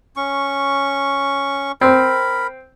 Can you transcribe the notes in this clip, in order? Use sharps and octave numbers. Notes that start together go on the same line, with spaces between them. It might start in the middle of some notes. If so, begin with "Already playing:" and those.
C#4 C#6
C4 A#4 B5